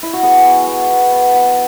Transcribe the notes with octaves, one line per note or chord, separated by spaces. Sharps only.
E4
F#4
B3 G#4
B3
B3
B3
B3
B3